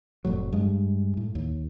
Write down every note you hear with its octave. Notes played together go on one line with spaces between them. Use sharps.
F1 A2 F#3
G2 G#3
A2
D#2